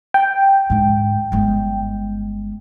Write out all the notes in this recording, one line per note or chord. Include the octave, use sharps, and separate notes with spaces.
G5
G#2 D3
G1 G#3